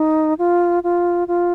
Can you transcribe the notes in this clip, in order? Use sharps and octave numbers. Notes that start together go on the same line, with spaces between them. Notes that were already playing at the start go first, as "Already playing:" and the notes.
Already playing: D#4
F4
F4
F4